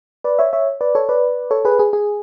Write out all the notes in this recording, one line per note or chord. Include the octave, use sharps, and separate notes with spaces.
B4 D5
C#5 E5
C#5 E5
B4 D5
A4 C#5
B4 D5
A4 C#5
G#4 B4
G#4
G#4